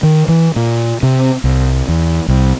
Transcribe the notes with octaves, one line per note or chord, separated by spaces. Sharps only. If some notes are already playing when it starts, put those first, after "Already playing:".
D#3
E3
A#2
C3
C2
E2
C2